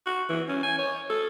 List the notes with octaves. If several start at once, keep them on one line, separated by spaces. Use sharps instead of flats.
F#4
E3
C#4
G#5
C#5
A4